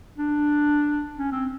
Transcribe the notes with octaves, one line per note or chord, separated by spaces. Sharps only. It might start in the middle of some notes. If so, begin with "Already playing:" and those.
D4
C#4
C4